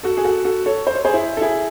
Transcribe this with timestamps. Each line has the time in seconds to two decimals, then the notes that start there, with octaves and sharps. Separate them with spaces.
0.03 F#4 A4
0.17 G#4
0.24 F#4 A4
0.45 F#4 A4
0.66 A4 C#5
0.87 C5
0.95 C#5
1.05 G#4 C5
1.14 E4
1.37 A4
1.41 E4 G#4